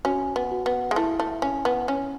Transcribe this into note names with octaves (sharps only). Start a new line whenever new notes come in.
C#4 F#4
B3
F#4
B3
G#3
A3 E4
A3
C#4
B3
C#4